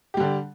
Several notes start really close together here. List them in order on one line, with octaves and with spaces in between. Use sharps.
G4 G3 D3 D4